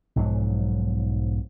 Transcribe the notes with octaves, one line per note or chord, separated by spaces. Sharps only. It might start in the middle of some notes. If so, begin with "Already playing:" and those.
B1 G#2 F3 F#3